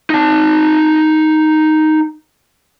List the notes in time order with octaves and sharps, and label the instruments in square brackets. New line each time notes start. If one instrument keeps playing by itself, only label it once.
[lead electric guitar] D#4 A5